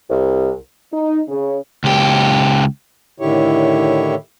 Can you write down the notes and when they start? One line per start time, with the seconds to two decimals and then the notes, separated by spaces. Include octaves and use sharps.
0.10 C2
0.92 D#4
1.28 C#3
1.84 C#2 G4
3.20 A2 D3 D#3 E4 G4 C#5